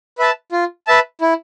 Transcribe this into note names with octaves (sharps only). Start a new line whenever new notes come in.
B4 E5 A5
F4
B4 E5 A5
E4